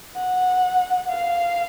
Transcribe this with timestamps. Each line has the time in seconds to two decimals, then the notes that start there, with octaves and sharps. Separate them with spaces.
0.16 F#5
1.09 F5